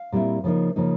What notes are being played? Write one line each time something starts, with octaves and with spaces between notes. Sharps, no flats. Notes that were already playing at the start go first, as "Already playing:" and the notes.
Already playing: F5
A#2 G3 C4 E4
C#3 F3 A#3 D#4
C#3 F3 A#3 D#4